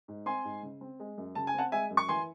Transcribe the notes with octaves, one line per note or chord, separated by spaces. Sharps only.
G#2
C4 G#5 C6
G#2
C#3
C4
G#3
F#2
C#3 A5
G#5
C4 F#5 A5
G#3 E5 G#5
F#2
C#6
E3 G#5 C6